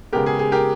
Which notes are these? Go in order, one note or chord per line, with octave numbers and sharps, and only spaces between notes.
C#3 G#3 B3 G4 A#4
G#4
G#4
G4 A#4